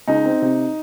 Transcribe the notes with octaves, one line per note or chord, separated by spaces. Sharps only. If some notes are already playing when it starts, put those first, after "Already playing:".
C#2 D#4
C4
C3